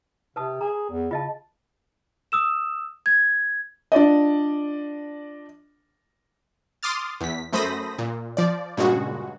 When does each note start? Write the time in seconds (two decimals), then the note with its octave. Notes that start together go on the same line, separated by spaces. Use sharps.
0.36 C3 B4 A5 D#6
0.61 G#4 A#5
0.90 E2
1.11 C#3 F4 D#5 A5
2.32 D#6 E6 E7
3.06 G#6
3.92 D4 F4 D5 D#5
6.83 C6 D6 D#6 F6 A6
7.21 E2 B6
7.53 F#2 A3 C5 B5 D#6 A#6
7.98 A#2
8.37 F3 D5
8.77 G2 A#2 C#3 G#3 F#4